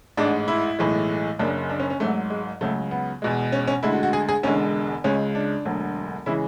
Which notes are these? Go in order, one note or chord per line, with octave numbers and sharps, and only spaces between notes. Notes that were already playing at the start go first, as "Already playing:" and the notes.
A1 G#2 G#3 D4
E4
B1 A2 E3 G#3
F#1 F#2 C#3 D4
D4
C#4
C#4
G#1 G#2 F#3 A3
G#3
C#2 C#3 F#3 A3
B3
E2 B2 G#3
C#4
C#4
D2 D3 G#3 E4
F#4
F#4
G#4
G#4
E1 E2 D3 G#3 C#4
C#2 C#3 G#3 C#4
D4
E1 D2 D3 F#3
C#3 E3 G#3 E4